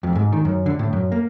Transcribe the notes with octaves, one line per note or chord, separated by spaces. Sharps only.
F2
G#2
D#3
F#2
D3
A2
F#2
A#3